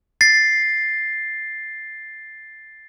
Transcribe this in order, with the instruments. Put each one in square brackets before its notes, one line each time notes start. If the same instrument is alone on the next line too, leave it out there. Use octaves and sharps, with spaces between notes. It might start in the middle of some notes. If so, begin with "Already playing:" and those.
[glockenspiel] A6 C7